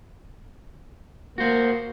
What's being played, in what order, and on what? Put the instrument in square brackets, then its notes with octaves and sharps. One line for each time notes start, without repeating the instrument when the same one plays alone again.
[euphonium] A#3 [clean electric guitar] F#4 C5